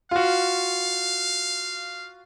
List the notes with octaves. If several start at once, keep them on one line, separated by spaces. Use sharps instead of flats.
F4 F#4 F5